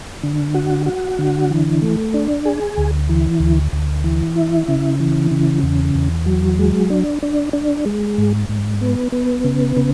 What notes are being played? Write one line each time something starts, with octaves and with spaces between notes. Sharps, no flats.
D3
F#4
F#4
D3
E3
A3
D4
G#4
D2
E3
D2
D2
E3
E4
C#3
E3
C#3
E2
E2
F#3
G#3
D4
D4
D4
G#3
G#2
G#2
B3
B3
C#3
C#3